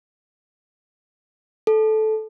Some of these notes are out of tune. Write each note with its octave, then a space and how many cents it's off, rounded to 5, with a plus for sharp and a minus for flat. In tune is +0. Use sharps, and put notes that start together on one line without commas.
A4 -15